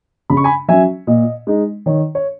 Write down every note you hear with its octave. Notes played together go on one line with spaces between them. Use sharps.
C#3 B5
C#6
G#5 B5
F#3 C#4 E5 G#5
A#2 D#5
G#3 D#4
D#3 C#5
C#5